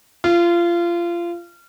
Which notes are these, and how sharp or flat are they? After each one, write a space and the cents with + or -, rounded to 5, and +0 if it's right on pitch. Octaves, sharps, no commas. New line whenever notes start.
F4 -25